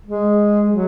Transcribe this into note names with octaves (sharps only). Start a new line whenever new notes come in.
G#3
F#3